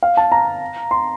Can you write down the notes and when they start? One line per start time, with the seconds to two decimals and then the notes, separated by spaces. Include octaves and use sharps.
0.02 F5
0.17 A5
0.32 A#5
0.91 C6